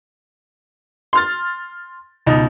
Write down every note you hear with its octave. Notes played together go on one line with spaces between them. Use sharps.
C6 F6 A6
C#2 B2 D#4